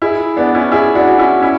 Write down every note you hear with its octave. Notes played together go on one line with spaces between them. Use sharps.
E4 G#4
B3 D4
C#4 E4
E4 G#4
D4 F#4
C#4 E4
C#4 E4